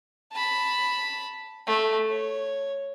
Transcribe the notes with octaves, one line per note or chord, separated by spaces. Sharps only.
A5 B5
A3
C#5